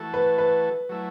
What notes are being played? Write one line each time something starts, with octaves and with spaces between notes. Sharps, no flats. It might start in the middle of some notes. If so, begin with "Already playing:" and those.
Already playing: E3 A3 F#4 A4
B4
B4
F#3 A3 E4